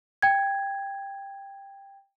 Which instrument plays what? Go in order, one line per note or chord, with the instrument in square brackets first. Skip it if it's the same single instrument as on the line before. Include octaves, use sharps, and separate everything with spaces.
[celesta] G5 G#6